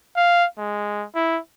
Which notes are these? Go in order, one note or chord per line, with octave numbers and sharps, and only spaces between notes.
F5
G#3
E4